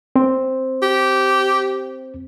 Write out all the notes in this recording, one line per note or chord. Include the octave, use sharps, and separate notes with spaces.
C4 C5
G4